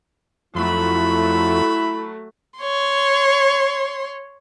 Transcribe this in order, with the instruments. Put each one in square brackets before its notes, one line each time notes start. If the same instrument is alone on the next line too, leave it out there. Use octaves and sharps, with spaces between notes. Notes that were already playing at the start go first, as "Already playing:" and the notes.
[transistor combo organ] F2 [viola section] F#3 A3 [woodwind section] E4 [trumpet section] E5 B5
[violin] C#5 C6